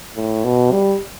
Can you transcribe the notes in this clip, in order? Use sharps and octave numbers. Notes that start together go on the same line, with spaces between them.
A2
B2
G3